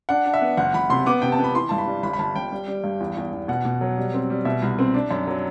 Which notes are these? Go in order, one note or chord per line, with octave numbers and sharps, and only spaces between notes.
D4 F#5
D4
E5
B3
F#1 F#5
F#1 B5
C3 C6
B3 D6
C3 G5
A5
B3
B5
E3 C6
G2 A5
B5
G3
G1 B5
B5
G1 A5
G1 G5
G3
G3
G2
E2
E2
E2
B2 F#5
B2
F#3
G3
C4
G3
B2 E5
C2
C4
D4
F#2
F#3